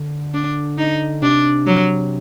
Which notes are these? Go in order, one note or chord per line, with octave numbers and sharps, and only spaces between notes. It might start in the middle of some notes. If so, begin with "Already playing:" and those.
Already playing: D3
D4
D#4
C3 D4
F#3